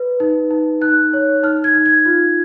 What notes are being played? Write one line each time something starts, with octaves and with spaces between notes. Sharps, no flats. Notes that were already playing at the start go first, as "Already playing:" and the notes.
Already playing: B4
D#4
D#4
D#4 F#6
C#5
D#4 F6
G#6
D#4
G#6
F4